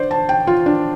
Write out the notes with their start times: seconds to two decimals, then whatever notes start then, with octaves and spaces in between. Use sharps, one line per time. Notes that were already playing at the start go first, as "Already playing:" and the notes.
Already playing: D3 C5 D5
0.11 A5
0.29 G5
0.47 F4
0.66 D4